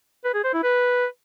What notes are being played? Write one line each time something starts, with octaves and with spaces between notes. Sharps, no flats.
B4
G#4
C5
E4
B4